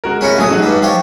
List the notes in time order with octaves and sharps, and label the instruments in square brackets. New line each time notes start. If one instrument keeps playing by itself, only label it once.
[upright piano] G#3 F#4 A#4
[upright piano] C3 G#3 C#7 [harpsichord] C#4 E4 F#4
[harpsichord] A1 G#4 [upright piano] F#3 C#4
[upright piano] F#3 D#4 F#4
[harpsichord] G2 G3
F3 G4 C#5